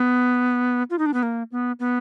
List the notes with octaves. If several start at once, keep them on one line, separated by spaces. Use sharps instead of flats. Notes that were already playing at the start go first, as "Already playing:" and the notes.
Already playing: B3
F4
D#4
D4
B3
A#3
B3
B3